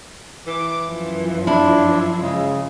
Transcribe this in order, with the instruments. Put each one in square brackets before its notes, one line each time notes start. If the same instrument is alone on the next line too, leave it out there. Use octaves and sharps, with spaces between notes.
[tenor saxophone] E3 [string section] D6
[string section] F#2 F3
[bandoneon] D4 [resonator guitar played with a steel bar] E4
[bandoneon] C#3 [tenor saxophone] G#3